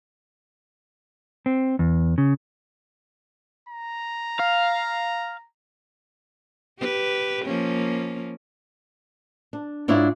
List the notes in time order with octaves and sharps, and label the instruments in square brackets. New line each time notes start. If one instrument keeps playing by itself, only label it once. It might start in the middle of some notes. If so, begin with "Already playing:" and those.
[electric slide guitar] C4
E2
C#3
[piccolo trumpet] A#5
[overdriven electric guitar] F5
[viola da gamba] G4 B4
F3 A#3 C#4
[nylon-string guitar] D4
G#2 D4 E4 F4 C#5